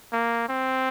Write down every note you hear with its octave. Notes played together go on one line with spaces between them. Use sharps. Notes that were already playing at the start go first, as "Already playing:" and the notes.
A#3
C4